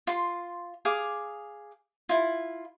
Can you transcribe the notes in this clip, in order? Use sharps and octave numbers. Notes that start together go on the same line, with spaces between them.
F4 C6
G#4 F5 D6
E4 F4